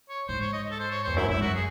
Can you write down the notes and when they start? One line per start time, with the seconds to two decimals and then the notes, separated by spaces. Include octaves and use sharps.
0.09 C#5
0.28 G#2 C5
0.41 C#5
0.53 D#5
0.71 A4
0.79 C5
0.91 C#5
1.04 E2 C5
1.16 F#2 E4
1.29 G#2 E4
1.42 F#2 F#4
1.55 G#4